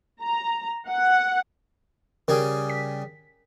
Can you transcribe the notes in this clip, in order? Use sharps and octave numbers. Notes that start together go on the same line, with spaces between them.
A#5
F#5
C#3 G3 G#4 A#4
B6